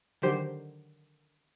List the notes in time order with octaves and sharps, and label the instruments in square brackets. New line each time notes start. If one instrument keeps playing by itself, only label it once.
[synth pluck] D3 D#3 F#3 G4 C5